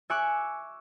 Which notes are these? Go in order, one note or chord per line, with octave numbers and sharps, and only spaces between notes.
E5 G#5 C#6 D6 F#6